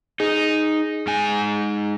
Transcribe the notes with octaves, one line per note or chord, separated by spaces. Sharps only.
D#4 G#4
G#2 G#5